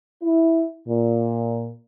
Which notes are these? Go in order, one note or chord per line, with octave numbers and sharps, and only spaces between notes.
E4
A#2